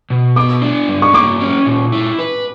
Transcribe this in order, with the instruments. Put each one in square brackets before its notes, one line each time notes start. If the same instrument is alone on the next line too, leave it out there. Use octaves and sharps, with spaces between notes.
[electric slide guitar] B2
[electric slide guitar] B3 [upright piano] D6
[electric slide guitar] D4
G2
[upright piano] C#6
[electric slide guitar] A#3 [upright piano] D6
[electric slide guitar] C#4
A#2
E4
B4